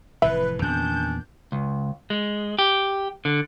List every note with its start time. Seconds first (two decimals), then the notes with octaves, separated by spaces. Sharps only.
0.22 F1 A2 E3 B4 E5
0.62 E2 A#2 D#3 B3 C#4 D4 G6
1.52 C#2
2.10 G#3
2.59 G4
3.25 D3